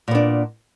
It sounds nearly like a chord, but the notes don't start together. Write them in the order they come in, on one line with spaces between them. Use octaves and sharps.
A#2 B3 D4